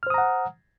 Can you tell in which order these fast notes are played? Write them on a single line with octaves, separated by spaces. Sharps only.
F6 C5 D#6 A#5 F#5